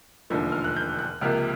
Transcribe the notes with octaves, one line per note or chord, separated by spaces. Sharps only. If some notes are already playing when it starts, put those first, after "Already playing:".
E1 D#2 D3 F3 A3
F6
F#6
G6
F#6
C#2 C3 F3 A#3 F6